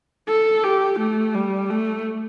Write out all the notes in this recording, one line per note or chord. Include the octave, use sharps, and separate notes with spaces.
A4
G4
A3
G3
A3